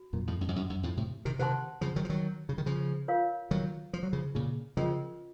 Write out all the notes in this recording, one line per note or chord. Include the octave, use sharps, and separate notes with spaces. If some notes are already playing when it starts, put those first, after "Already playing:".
Already playing: F#4
F#2 A#2
F2 A2
F#2
F2
F#2
F#2
F2 A2
A2 C3
C3 D#3
C3 D#3 C5 F#5 A5 C6
C#3 F3
D#3 F#3
F3
D#3 F#3
C#3
D#3
C#3 F3
F4 A#4 C#5 F5
D#3 F#3
F3
F#3
C#3 F3
A#2 C#3
C#3 F3 C#4 F4 A#4 D#5